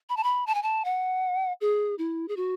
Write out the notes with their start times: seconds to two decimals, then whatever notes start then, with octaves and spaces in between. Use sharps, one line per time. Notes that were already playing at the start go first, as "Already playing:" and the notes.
0.09 B5
0.17 A5
0.23 B5
0.47 A5
0.55 G#5
0.63 A5
0.85 F#5
1.61 G#4
1.98 E4
2.28 G#4
2.37 F#4